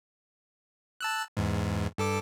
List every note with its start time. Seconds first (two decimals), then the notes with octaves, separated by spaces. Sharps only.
1.01 A5 E6 F#6
1.37 E2 G#2
1.98 G2 A4 D6